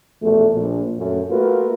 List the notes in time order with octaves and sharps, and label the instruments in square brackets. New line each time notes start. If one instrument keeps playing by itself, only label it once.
[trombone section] A#1 E2 B2 A3
A#1
F#2 A3
A3 A#3 F4 F#4 A#4 B4